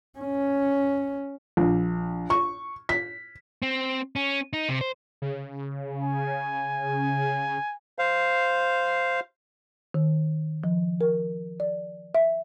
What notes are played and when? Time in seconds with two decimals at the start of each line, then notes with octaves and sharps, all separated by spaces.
0.19 C#4
1.57 A#1
2.30 C#6
2.89 B6
3.62 C4
4.16 C#4
4.53 D#4
4.69 C3
4.81 C5
5.22 C#3
6.04 G#5
7.99 C5 F5
9.94 D#3
10.64 F3
11.01 A#4
11.60 D5
12.15 E5